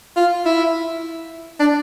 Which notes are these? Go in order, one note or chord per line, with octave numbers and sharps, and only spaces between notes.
F4
E4
D4